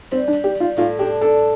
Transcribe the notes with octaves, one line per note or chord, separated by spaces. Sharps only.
G3 C4
D4
G3
G4
G3
F4
A2 F4
D4 G4
D4 A4